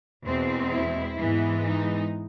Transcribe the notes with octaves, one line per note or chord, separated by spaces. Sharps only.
E2 B2 G#3 C4
E4
G#2 E3 G#3 B3
D#4